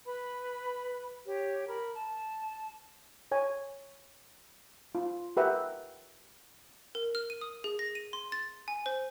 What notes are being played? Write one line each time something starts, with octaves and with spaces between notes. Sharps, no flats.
B4 B5
G4 C#5
A#4 B5
A5
C#5 G#5
F4
G4 A#4 B4 E5 F#5 G5
A#4
F6
D#7
D#6
G#4
A#6
D#7
C6
A6
G#5
C5